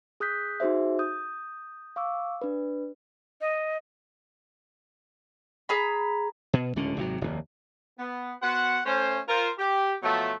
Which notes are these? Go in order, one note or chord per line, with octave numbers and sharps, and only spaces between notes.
G#4 D#6 F#6 G6 B6
D#4 F#4 G#4 C5 E5
D#6 G6
F5 C#6 D6 E6
D4 B4
D#5
G#4 A#5 B5
B2
D1 C#2 D3 C#4
G#1 C3 F3 F#3
F1 D#2
B3
B3 F#4 C5 F#5
A3 C#4 C5
F4 A#4 C5
G4
B2 F3 F#3 A3